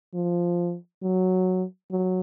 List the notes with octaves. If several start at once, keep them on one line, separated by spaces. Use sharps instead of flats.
F3
F#3
F#3